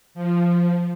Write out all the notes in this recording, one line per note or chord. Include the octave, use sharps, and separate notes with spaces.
F3